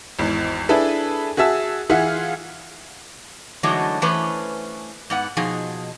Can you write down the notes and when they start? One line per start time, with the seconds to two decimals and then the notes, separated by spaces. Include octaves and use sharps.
0.19 G#1 E2
0.69 D4 E4 G#4 A4 B4
1.37 F#4 G#4 E5 A5 E6
1.89 E3 F4 G#4 E5 F#5
3.63 D3 E3 F#3 G#3 A3 D#4
4.02 E3 A3 C#4 B4 C5
5.10 G#2 B3 F#5
5.37 B2 F3 D#4 G#4